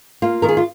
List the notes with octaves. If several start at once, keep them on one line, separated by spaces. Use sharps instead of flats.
A#3 F4
D#3 A#4
G#4
F4